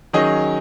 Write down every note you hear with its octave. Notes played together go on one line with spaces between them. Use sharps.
D#3 F#3 C#4 G#4 D#5